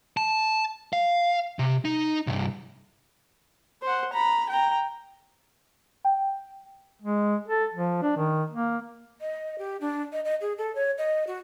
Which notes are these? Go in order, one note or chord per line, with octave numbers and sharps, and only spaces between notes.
A5
F5
C3
D#4
C2 G2
C5 F#5
A#5 B5
G5 A#5
G5
G#3
A4
F3
D4
D#3
A#3
D#5
G4
D4
D#5
D#5
G#4
A4
C#5
D#5
F#4